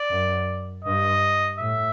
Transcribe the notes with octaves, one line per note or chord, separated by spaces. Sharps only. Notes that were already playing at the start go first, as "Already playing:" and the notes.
Already playing: D5
F#2
G2 D#5
A2 E5